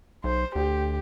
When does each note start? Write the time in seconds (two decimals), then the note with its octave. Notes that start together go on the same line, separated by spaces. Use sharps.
0.24 B1 C5
0.56 D2 G4